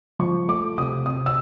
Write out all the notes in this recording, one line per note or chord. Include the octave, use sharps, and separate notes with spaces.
F3 C#6
A3 D6
C3 D#6
C3 D#6
E6